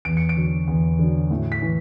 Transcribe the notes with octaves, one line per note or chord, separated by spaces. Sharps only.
E2 D7
C#7
D7
D3 F#3
E2
D3 F#3
A2
B6
E3